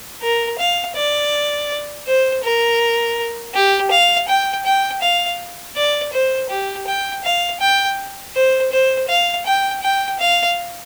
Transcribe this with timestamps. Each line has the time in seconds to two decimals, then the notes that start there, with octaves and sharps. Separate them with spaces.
0.22 A#4
0.58 F5
0.96 D5
2.07 C5
2.44 A#4
3.54 G4
3.91 F5
4.28 G5
4.65 G5
5.02 F5
5.76 D5
6.13 C5
6.50 G4
6.87 G5
7.24 F5
7.61 G5
8.35 C5
8.72 C5
9.09 F5
9.46 G5
9.83 G5
10.19 F5